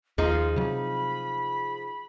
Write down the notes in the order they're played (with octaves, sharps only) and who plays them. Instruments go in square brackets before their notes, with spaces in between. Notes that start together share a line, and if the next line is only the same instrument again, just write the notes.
[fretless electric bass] D#2 [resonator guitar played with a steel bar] F3 D#4 [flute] F4 [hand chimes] G#4
[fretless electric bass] C3 F#3 [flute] B5